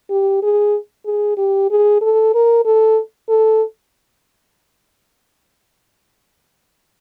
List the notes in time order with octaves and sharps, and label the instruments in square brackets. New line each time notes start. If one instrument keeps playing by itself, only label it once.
[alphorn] G4
G#4
G#4
G4
G#4
A4
A#4
A4
A4